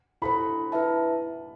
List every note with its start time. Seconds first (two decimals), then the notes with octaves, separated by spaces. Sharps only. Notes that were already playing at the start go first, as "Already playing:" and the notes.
0.22 E4 A4 C5 B5
0.72 E4 B4 E5 A5